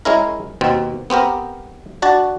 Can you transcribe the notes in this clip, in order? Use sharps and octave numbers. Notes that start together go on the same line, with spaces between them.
G#3 C#4 E4 A#4
D#2 B2 C4
B3 C4 G4 A#4
D4 F#4 A5